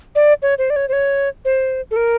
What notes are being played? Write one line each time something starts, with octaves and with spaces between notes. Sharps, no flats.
D5
C#5
C5
D5
C#5
C5
C#5
C5
A4
A#4